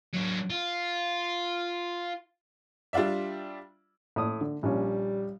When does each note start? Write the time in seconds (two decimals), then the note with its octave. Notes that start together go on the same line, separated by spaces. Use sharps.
0.13 F#3 D4
0.50 F4
2.93 G3 D4 F4 D5 E5
4.16 A2 D#6
4.41 D3
4.63 A#1 G3 C#4